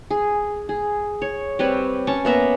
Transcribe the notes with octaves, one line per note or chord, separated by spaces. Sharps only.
G#4
G#4
C#5
G3 C4 B4 C#5
C#4 A5 C#6
A#3 B3 E5 A#5